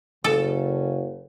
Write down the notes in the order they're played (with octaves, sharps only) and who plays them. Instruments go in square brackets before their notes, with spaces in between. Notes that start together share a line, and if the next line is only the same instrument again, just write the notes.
[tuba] F#1 [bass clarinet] C#3 [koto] A4